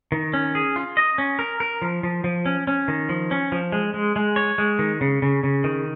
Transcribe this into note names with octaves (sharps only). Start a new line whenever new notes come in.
D#3
C#4
G#4
F4
D#5
C#4
A#4
A#4
F3
F3
F3
C#4
C#4
D#3
F3
C#4
F3
G#3
G#3
G#3
C#5
G#3
D#3
C#3
C#3
C#3
D#3